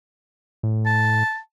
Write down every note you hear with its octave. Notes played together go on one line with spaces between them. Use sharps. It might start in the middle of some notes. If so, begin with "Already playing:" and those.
A2
A5